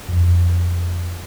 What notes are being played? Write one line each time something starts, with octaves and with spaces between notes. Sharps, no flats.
F2